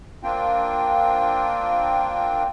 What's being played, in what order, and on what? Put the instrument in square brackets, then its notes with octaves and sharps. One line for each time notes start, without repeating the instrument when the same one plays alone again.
[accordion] A#3 C4 D4 F4 G5